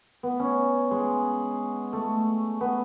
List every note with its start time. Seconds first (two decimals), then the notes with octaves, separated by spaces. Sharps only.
0.23 B3
0.40 C#4
0.91 G#3
1.93 A3
2.61 B3